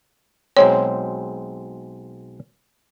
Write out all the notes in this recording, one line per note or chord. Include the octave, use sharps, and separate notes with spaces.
B1 G#3 C4 C#5